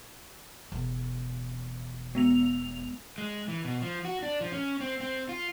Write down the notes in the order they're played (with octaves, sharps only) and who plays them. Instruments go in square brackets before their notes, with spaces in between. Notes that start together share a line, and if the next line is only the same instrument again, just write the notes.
[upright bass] E1
[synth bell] G#3 B3 F7
[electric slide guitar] G#3
E3
B2
F3
F#4
D4
F3
C#4
C4
C4
F4